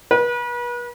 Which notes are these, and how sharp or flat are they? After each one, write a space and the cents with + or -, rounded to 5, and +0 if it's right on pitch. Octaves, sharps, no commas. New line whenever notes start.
B4 -35